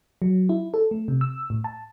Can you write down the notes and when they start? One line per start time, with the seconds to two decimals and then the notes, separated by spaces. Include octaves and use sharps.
0.22 F#3
0.49 E4
0.74 A4
0.91 A3
1.08 C3
1.21 E6
1.50 A2
1.64 A5